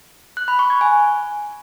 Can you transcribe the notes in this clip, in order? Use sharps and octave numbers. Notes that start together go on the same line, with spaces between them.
F#6
B5
C#6
G#6
G#5